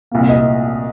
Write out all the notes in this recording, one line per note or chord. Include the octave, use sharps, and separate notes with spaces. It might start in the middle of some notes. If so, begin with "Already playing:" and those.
C2 A#2 A#3
D#5